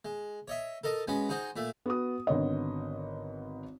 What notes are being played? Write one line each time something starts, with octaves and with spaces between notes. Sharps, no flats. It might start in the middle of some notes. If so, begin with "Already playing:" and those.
G#3
C#5 D#5 E5
A4 A#4 D#5 A5
G#3 B3 C#4 F#4
D#4 F#4 G#4 C5
A#2 A3 E5
B3 F#4 D#6
G#1 D3 B3 C#5 D#5